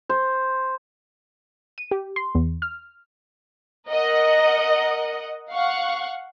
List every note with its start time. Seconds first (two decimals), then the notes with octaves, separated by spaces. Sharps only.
0.09 C5
1.78 D#7
1.91 G4
2.16 C6
2.35 E2
2.62 F6
3.89 A#4 D#5 F#5
5.53 F5 F#5 C#6